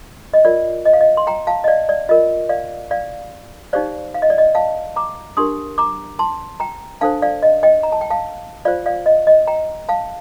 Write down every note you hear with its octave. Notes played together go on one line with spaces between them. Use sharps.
D#5
F4 A#4 D5
D#5
F5
D#5
C6
G5 A#5
F5 A5
D#5
D5 F5
D5
F4 A#4 D#5
D5 F5
D5 F5
D#4 G4 C5 D5 F5
F5
D#5
D5
D#5
F5 A5
A#5 D6
D4 G4 A#4 C6 D#6
A#5 D6
A5 C6
G5 A#5
D4 A4 C5 F5 A5
D5 F5
D#5
D#5 G5
A#5
A5
G5
F5 A5
F4 C5 D5 F5
D5 F5
D#5
D#5
G5 A#5
F5 A5